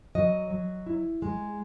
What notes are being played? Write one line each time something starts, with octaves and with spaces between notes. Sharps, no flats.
F#3 D#5
F#3
E4
G#3